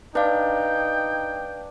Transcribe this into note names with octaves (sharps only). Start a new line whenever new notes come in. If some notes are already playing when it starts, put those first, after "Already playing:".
D4 D#4 B4 F5 G5